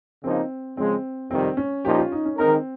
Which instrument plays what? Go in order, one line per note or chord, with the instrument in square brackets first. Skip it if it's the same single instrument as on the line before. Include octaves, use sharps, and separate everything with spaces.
[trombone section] C#3 F3 A#3 D#4 [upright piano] C4
[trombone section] C#3 F3 G#3 [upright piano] C4
[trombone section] F2 C3 D#3 G3 [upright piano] C4
[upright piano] C#4
[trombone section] A#2 F3 A#3 D#4 [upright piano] G4
[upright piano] F4
D#4
C#4
[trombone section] D#3 G#3 D#4 A#4 [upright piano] C4